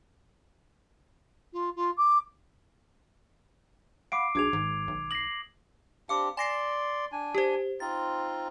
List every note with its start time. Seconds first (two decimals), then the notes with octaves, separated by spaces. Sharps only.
1.53 F4
1.76 F4
1.97 D6
4.12 F5 F#5 B5 D6 C7 D7
4.35 B1 D4 F#4 G#4 D6 G#6 F7
4.53 G#1 G#2
4.88 B1
5.11 D#6 A#6 C7 F#7
6.09 C4 D4 G4 F5 D6
6.37 D5 G#5 C6 A#6 C7
7.12 D4 G#5
7.35 G4 C5
7.80 C4 D#4 F4 A6